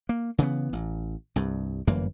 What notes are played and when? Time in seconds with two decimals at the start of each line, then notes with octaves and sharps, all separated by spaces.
0.09 A#3
0.38 C#3 E3 G3 B3
0.73 A1
1.36 C2 G2
1.87 G1 F#2 E3 A#3